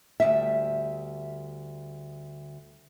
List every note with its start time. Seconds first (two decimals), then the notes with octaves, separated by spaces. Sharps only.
0.20 D2 G#2 G3 E5